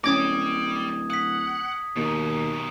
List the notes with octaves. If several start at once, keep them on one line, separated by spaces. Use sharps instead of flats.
D1 C#4 G4 D5 D6 D#6 G#6 A#6
F#5 D#6 B6
D#2 B2 D#3